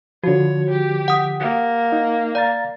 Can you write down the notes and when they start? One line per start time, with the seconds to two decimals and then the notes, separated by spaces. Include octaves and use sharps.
0.24 D3 F3 F#4 C#5
0.70 G4
1.08 F#5 D#6
1.40 A#3
1.92 D#4
2.35 D5 F5 A#5 A6